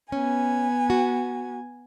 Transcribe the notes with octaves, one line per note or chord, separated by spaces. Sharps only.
B3 C#4 G#5
F#4